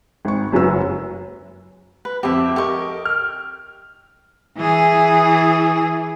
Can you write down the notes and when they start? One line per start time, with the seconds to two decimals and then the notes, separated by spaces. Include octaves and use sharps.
0.25 G#1 C#6
0.52 F#1 F#2 F#3 B4 E6
2.05 B4
2.23 F2 C4 G4 E5
2.56 G4 A4 A#4 D#5 C#6
3.05 F6
4.57 E3 G#4